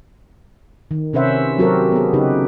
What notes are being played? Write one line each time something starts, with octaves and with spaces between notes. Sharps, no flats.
D#3
C3 C#4 B4 C5 E5 F#5
F#3 C4 F#4 G4 A4 A#4
B3 G#4
C#3 D#4 G4 B4